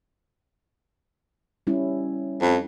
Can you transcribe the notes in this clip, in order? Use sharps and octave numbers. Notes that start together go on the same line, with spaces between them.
G3 C#4 E4
F2